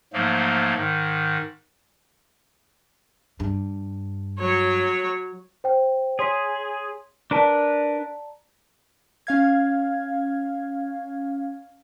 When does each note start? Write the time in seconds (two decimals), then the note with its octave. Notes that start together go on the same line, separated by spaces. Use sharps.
0.13 G#2 F3 F#3 A3 A#3
0.77 G#2 D#3
3.40 G2
4.39 F#3 C#5
5.64 C5 G5
6.19 G#4 C#5 C6 B6
7.31 D4 A#4 B4 D5 A5 A#5
9.27 C#4 F5 G#6